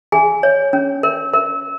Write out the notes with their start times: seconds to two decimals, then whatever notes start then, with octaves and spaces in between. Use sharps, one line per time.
0.12 G#4 G#5
0.43 C#5
0.73 C#4
1.03 A#4
1.33 A#4